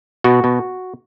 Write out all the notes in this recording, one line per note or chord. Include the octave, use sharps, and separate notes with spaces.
B2 F#4
B2